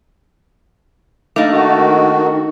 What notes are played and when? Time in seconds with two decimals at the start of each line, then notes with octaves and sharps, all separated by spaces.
1.36 A3 A#3 D4 D#4
1.52 D#3 F#4